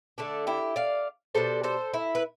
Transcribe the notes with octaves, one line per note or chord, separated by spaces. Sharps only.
D3 A3 D4
E4 G4
D5 F5
B2 G3 D4 A4 C5
A4 C5
E4
B4